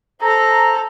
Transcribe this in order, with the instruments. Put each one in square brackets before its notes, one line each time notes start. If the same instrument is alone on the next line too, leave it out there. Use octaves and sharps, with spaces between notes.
[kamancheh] A4 [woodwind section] C5 A#5